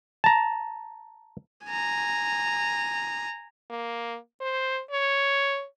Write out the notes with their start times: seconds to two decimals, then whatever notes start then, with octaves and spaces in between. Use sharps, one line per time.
0.24 A5 A#5
1.66 G#5 A#5
3.70 A#3
4.41 C5
4.90 C#5